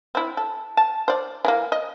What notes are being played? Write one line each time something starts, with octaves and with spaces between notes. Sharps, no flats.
C4 E4
A4
A5
C5 D5
E3 G#3 A#3
D#5